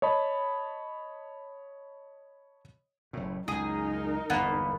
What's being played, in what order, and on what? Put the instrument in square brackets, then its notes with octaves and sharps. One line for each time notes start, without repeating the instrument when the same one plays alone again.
[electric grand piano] C#5 D#5 A5 B5
[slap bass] F#1 A2
[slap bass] C#2 F#2 [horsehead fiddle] D#4 A#4 [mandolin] G#4
[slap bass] G1 E2 G#2 [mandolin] A#3 B3